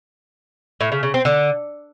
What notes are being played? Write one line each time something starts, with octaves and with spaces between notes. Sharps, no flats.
A2
C#3
C#3
C4
D3